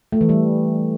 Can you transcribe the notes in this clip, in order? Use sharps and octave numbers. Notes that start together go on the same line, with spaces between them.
A3
E3
G3